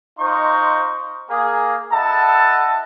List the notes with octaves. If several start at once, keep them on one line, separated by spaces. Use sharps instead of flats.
D#4 F4 C5 D#5 C#6
A#3 G#4
E4 A4 D#5 E5 F#5 A5